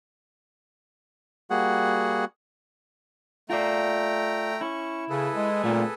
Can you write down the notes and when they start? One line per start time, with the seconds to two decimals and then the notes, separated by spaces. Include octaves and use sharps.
1.50 G3 A#3 F#4 G#4 F#5
3.50 A3 F4 D5 G5 A#5
4.61 C#4 E4 C#6
5.10 C#3 G#4 A4 B4
5.35 G#3
5.64 A#2 A3 A#3 C4